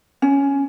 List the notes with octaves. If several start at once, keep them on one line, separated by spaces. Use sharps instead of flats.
C#4